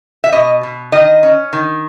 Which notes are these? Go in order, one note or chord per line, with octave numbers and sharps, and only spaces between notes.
E5
B2 D#5
B2
D#3 D#5
C#4
D#3